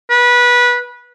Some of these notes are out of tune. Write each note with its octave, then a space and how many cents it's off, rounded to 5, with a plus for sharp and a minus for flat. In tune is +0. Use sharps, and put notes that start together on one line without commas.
B4 -20